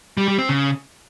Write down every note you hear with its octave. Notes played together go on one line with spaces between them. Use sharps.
G3
G3
C4
C#3